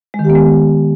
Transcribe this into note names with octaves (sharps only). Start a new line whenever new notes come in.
G#3
D#3
G4
B3
G#3